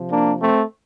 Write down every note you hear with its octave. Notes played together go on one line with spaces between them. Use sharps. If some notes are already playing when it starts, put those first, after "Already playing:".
Already playing: C3 F3
A#3 D4
A3 C4